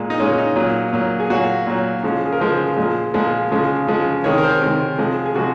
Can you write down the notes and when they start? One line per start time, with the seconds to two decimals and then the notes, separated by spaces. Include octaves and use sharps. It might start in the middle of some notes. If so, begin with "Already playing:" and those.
Already playing: A#2 G#3
0.10 D#4
0.20 A#2 G#3 C#4
0.38 D#4
0.56 A#2 F#3
0.93 A#2 F#3
1.20 G#4
1.30 A#2 F#3 F#4
1.67 A#2 F#3
2.03 C#3 F3 G#3
2.26 G#4
2.32 A#4
2.40 C#3 F3 G#3 C5
2.77 A#2 F3 G#3
3.14 A#2 F3 G#3
3.51 C#3 F3 G#3
3.87 C#3 F3 G#3
4.24 C3 D#3 G#3 C#5
4.38 A#4
4.43 C5
4.62 C3 D#3 G#3
4.99 C3 F3 G#3
5.26 G#4
5.35 C3 F3 G#3 F#4